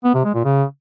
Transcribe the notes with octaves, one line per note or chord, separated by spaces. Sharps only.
B3
C3
G#3
A#2
C#3